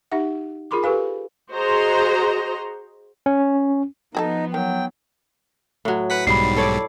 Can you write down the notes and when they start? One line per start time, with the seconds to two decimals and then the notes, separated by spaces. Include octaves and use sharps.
0.12 D#4 G4 E5 F#5
0.71 F4 G#4 A#4 B5 C6 D6
0.83 G4 A4 B4 F5 G#5
1.51 F#4 G#4 C5 D#5 A#5 C6
3.26 C#4
4.15 F3 B3 D#4 F#4 G4 A4
4.54 D#3 F#3 G5
5.85 A2 F#3
6.10 B4 F#5 B6
6.27 B1 G#2 G3 B5 C7
6.57 A4 C#5 D5